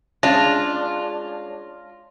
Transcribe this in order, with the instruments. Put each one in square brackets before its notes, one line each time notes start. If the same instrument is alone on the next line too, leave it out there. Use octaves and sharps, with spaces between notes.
[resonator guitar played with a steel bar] G#3 C#4 [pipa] D4 [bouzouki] F4 [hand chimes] A#6